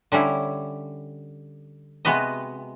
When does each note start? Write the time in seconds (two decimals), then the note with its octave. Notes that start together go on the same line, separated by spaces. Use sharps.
0.12 D3 G3 C#4 E4
2.05 C3 G#3 B3 F#4 B4 D#5